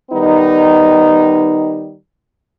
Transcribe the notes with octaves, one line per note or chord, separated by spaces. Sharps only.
D#3 G3 B3 D#4